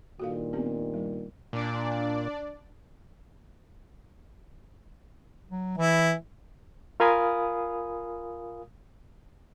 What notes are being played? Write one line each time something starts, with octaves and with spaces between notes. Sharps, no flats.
G2 A#2 D#3 F#4 A4 F5
B3 C4 G4
G3
A#2 D4 D5
F#3
E3 E4
F4 A#4 F5 G#5 B5 D#6